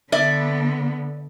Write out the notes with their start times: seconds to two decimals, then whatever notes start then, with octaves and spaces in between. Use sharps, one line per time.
0.12 D3 B3 D5 E5